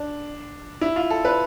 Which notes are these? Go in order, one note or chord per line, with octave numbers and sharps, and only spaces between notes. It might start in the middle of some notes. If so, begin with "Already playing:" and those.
Already playing: D4
E4
F4
A4
B4